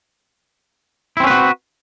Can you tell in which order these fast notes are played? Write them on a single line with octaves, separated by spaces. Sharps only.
E4 C4 C#4 B4 F#4